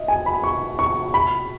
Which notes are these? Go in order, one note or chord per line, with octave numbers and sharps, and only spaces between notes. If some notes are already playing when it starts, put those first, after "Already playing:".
Already playing: D#5 E5
G#5
B5
C#6
C#6
B5